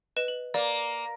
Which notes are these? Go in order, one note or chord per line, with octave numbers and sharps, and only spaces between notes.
B4 D#5 E7
F#7
A#3 D5